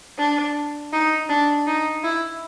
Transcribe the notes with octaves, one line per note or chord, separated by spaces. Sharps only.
D4
D#4
D4
D#4
E4